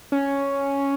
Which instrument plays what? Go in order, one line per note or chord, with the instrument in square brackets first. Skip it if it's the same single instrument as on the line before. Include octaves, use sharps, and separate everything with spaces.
[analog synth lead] C#4